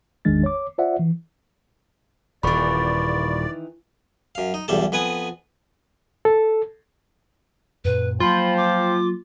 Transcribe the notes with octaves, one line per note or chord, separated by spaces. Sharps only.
G#1 E2 D#3 G#3 D4 A6
C#5 D6
F4 C5 D5 E5 F#5
E3
D#1 D#3 E3 D5 B5 C#6
F#2 F5
D#4
B1 E2 G3 A4 A5
F2 B3 B4 G#5 D#6
A4
F#2 A#2 B4
F3 F#3 A#3 F4 C5 G5 B5
D6